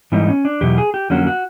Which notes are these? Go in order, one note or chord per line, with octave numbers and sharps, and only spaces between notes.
G#2 E3 G3 B3 D#4
C#4
D4
E2 B2 F#3 G4
G#4
G4
F2 D3 F#3 A#3 C#4 F#4
F#4